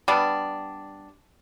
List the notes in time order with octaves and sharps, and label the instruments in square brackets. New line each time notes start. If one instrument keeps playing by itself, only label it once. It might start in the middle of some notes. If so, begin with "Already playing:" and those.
[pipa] G3 B3 D4